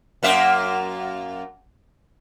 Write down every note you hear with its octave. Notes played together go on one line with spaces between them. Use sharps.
F#2 A#3 E5